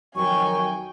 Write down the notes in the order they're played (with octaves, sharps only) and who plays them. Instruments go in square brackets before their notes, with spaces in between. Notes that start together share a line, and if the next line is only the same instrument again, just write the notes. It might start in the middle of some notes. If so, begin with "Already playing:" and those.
[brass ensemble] F2 D#3 F#3 [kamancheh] G5 G#5 [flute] C#6